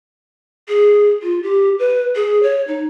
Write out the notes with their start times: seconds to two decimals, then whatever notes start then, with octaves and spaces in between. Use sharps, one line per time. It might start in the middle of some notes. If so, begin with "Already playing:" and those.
0.69 G#4
1.22 F4
1.43 G4
1.79 B4
2.16 G#4
2.43 C#5
2.68 D#4